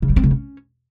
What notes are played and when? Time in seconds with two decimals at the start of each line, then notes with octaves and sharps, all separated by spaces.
0.02 C#3
0.09 G3
0.16 C4
0.23 C#3
0.30 C#4